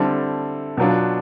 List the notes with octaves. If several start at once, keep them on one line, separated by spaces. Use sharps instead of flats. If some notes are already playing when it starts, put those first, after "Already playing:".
Already playing: D3 G3 C4 E4 A4
B2 F#3 B3 D4 F4